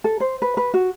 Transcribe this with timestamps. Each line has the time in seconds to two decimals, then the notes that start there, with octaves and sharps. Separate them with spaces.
0.04 A4
0.20 C5
0.42 B4
0.57 B4
0.74 F#4